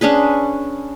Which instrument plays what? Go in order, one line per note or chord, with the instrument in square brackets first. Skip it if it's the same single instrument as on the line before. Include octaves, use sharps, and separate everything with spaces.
[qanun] C#4 D4 G#4 B4